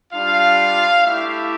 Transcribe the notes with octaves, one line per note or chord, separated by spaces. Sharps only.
G3 D4 F4 F5
A3 E4 G4 E5